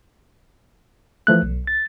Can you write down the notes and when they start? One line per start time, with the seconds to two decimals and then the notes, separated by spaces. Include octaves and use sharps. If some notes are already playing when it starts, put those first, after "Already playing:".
1.27 E3 F3 A3 F#6
1.42 B1
1.67 A6